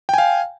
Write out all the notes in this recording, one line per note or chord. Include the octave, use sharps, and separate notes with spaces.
F5 G5 G#5